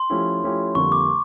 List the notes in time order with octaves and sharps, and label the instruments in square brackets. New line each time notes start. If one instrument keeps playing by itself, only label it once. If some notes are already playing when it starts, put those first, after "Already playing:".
Already playing: [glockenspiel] C6
[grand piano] F3 A3 C#4 E4 G4
F3 A3 C#4 E4 G4
[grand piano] F2 D3 G3 A#3 [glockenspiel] C#6
[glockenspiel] D6